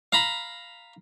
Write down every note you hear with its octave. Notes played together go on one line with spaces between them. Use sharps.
F5 A#5 B5